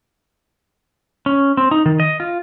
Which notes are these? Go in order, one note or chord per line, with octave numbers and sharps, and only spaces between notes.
C#4
C4
D#4
D#3
D#5
F4